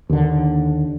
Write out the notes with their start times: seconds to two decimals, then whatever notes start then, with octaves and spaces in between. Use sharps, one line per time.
0.10 D#2 D3